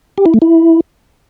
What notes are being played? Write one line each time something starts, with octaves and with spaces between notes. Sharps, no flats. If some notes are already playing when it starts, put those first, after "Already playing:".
G4
E4
A3
E4